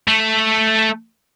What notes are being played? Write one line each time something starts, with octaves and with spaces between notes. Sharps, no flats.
A3